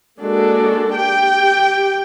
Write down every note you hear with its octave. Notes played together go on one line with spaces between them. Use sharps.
G#3 A#3 D4 F#4 A4
G4 G5